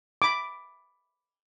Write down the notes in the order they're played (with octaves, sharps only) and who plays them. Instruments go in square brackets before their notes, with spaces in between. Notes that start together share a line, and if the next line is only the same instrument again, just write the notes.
[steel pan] B5 D6